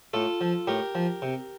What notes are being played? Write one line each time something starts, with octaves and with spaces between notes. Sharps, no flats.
A2 F4 A4
F3
A2 G4 A#4
F3
C3